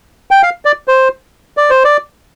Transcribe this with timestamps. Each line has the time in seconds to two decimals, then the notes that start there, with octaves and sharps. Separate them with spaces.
0.31 G5
0.43 F5
0.65 D5
0.88 C5
1.57 D5
1.70 C5
1.84 D5